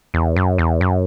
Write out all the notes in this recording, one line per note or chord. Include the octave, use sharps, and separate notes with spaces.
E2
F#2
E2
F#2